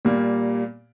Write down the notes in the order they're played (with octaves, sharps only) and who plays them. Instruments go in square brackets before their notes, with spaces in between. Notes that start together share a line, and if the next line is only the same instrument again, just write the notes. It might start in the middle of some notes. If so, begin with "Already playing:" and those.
[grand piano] A#2 G3 A#3